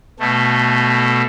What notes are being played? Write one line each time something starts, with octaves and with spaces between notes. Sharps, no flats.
B2 A3